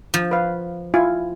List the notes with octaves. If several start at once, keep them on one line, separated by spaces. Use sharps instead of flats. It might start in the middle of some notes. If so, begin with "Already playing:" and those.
F3
B4 F5
E4 F4 G#5